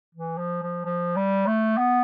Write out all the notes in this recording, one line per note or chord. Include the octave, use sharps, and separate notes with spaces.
E3
F3
F3
F3
G3
A3
B3